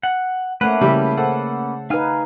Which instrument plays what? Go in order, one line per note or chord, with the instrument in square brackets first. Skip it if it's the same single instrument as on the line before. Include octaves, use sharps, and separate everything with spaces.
[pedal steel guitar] F#5
[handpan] A3 [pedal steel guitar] A#3 C#4 B4 [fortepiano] F#5 F#6
[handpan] C#3 [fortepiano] G3 E4 G4
[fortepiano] A4 C5 F#5
[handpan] D#4 B4 [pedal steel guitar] F5 G#5 F6